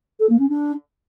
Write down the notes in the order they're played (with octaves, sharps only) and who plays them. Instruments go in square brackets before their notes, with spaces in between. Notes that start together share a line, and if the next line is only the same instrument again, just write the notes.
[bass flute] A4
A#3
C#4
D4